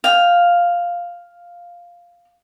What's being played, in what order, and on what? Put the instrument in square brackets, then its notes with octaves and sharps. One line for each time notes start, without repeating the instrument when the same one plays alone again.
[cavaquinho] F5 G5